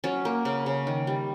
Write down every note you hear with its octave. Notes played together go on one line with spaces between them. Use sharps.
F#3 C#4
A#3
C#3
C#3
D#3
G3